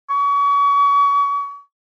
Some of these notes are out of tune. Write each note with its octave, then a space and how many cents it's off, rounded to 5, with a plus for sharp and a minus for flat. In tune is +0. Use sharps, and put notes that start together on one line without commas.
C#6 +35